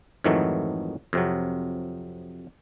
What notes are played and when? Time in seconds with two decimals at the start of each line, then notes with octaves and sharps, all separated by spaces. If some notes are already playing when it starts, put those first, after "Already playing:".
0.24 F2 G#2 D#3 E3 F#3 A3
1.13 F2 C3 F#3